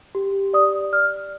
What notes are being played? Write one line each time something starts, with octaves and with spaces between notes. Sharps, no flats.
G4
D5 D#6
D5 F6